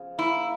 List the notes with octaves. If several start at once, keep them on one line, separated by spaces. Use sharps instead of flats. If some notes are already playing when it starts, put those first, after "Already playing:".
Already playing: C#3 F3
A#3 E4